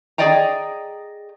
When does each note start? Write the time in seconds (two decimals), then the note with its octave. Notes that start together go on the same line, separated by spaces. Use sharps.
0.18 G#4 C5 D5 D#5 G5 A#5